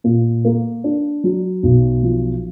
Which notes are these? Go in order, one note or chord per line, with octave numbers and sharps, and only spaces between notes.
A#2
A#3
D4
F#3
B1
F3